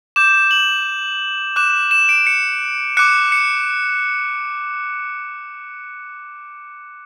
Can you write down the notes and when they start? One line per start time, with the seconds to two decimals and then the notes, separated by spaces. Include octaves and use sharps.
0.16 D6 G6 E7
0.51 F#7
1.56 D6 F#6 E7
1.91 E7
2.09 D7
2.27 C#7
2.97 D6 F#6 C#7
3.32 C#7